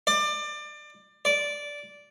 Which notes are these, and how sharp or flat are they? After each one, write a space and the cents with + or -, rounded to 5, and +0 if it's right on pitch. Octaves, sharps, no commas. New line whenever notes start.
D5 +25
D5 -10